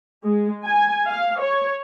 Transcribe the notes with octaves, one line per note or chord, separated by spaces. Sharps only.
G#3
G#5
F5
C#5